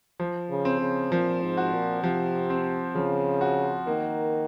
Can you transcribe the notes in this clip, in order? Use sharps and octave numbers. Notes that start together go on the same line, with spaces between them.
F3
C#3
C4
C#3
A#2 F3
G#2
F#4
A#2
C3 F3
C4
C#3 F3
F#4
D#3 A#3